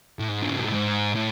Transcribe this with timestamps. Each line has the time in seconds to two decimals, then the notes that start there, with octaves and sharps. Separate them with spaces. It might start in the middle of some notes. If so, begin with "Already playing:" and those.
0.19 A2
0.29 G#2
0.42 D3
0.49 C#3
0.57 B2
0.65 A2
0.72 G#2
1.15 A2